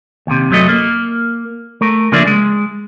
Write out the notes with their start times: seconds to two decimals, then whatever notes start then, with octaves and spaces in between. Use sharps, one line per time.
0.27 D#2 C3
0.51 F#2 F#3 A3 D#5
0.69 A#3
1.81 A3 A#4
2.12 C#3 F3 A#3 D4 D5 E5
2.27 G#3